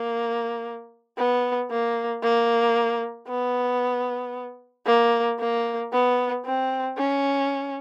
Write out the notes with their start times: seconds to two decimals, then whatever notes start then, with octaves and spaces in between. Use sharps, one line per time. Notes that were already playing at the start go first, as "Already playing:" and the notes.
Already playing: A#3
1.18 B3
1.70 A#3
2.23 A#3
3.28 B3
4.86 A#3
5.39 A#3
5.93 B3
6.45 C4
6.98 C#4